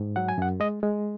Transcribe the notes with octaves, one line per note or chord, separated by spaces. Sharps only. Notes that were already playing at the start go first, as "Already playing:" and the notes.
Already playing: G#2
F#3 F#5
G#5
F#2 F#5
G#3 D#5
G#3